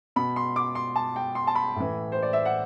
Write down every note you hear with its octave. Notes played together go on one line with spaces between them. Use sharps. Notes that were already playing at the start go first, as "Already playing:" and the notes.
B2 B5
C6
D6
C6
A5
G5
C6
A5
B5
A2 E3
C5
D5
E5
F#5